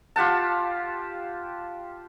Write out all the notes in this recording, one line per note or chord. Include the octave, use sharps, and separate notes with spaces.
F4 G4 F#5 A5